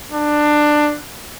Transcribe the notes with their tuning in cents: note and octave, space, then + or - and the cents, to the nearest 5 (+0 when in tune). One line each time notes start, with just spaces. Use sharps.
D4 +15